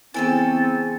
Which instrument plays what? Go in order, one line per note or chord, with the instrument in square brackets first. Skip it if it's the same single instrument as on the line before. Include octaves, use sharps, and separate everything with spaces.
[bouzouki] C#3 A4 G#5 [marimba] E3 B3 E4 [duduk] C4 [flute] A6